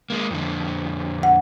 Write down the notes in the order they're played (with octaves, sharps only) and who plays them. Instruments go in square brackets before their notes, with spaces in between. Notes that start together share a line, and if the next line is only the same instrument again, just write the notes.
[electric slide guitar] G#3 A#3
F2 D3
[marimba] F#5